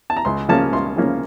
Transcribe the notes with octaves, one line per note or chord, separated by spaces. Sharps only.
A5
A#5
C#2 C6
C#3 F3 A#3 C#4 A5
C#2 C6
C#3 F3 A#3 C#4